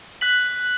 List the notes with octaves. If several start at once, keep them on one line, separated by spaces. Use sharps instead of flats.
F#6 B6 F#7